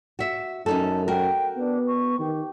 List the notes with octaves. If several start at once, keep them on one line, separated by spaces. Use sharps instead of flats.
F#4 E5
F#2 C#4 D#4 A4
F#4 A#4 G5
B3 D4
C#6
D#3 G4